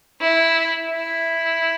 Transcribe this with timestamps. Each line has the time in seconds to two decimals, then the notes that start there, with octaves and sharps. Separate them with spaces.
0.21 E4
0.90 E4